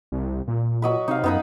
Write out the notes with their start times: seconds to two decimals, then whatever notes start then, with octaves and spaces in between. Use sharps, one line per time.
0.12 C2
0.48 A#2
0.82 F#3 D#5 B5
1.08 C3 D#4 F5
1.24 F#2 B3 D#4 B5